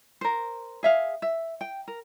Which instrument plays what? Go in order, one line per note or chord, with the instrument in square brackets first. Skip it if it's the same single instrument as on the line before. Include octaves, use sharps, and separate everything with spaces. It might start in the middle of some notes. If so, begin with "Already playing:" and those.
[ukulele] A#4 C5
G#4 E5 F5
E5
G5
A#4